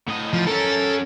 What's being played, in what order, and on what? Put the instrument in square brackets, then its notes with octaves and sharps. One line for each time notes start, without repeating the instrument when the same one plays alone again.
[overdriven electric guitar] A2 D#5
[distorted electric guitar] F3
[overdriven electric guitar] C#4 A#4 [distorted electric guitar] A4